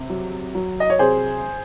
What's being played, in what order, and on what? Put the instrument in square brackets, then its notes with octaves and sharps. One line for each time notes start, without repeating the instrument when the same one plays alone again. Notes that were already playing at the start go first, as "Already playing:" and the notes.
Already playing: [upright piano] C3
F#3
F#3
D#5
C#5
C3 G#4 C5